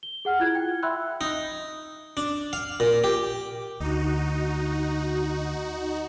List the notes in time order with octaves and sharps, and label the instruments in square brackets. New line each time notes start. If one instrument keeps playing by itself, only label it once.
[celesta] G7
G#4 F#5 F6
E4 F4 F#6 G#6
G5
E5 G5 B5 C6 E6 F#6
[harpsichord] D#4
D4
F5
A#2
G4
[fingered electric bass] D2 [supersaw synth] D#4 F#4